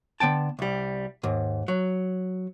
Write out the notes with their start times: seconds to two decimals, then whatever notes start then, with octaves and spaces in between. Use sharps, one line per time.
0.20 D3 B3 G5 A5
0.59 C2 G3
1.23 D#2 G#2
1.68 F#3